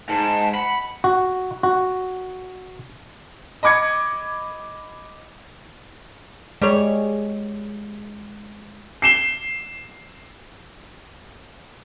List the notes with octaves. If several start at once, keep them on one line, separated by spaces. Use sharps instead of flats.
G#2 A5
F#5 B5
F#4
F#4
D#5 B5 D6 G#6 C#7
G3 G#3 C#5
C7 E7 G7